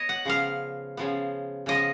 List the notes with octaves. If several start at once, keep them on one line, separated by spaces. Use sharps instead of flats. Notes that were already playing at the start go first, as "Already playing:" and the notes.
Already playing: B3 C#5 D#5
F#5
C#3 F3 B3 F5
C#3 F3 B3
C#3 F3 B3 D#5